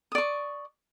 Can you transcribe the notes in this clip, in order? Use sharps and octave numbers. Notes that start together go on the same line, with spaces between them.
D5 C#6 D#6